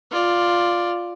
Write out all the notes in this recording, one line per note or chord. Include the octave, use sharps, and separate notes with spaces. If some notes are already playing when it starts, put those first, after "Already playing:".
F4 D5